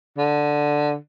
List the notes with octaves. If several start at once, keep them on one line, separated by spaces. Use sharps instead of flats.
D3